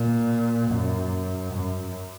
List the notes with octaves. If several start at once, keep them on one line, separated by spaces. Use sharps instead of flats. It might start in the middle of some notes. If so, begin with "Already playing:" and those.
Already playing: A#2
F#2
F#2